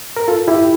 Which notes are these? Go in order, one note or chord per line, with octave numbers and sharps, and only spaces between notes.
A#4
F4 A4
E4 G4